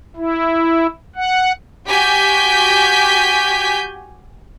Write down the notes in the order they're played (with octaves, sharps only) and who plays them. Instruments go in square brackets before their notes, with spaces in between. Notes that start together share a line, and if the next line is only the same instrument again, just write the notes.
[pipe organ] E4
F#5
[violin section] F#4 G4 G#5 G6 B6